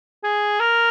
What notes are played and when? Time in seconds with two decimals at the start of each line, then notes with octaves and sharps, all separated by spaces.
0.23 G#4
0.60 A#4